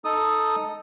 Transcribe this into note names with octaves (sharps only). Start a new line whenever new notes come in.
D#4 A4 D#6